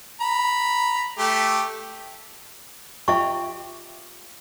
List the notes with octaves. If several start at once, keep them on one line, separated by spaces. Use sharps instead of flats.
A#5 B5
A3 G4
F4 G4 E5 C#6